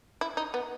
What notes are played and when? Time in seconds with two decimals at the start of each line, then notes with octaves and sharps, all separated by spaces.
0.21 E4
0.37 D#4
0.54 B3